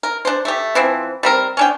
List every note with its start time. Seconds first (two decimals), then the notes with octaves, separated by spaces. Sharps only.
0.03 A#4
0.25 D4 C5
0.45 A3 G4
0.75 E3 F3 C4
1.23 G3 C4 A#4
1.57 C#4 D4 G5